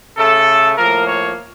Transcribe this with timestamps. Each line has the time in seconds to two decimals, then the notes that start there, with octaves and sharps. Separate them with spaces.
0.17 C#3 A3 A4
0.77 A2 F3 A#3 A#4
1.07 C#5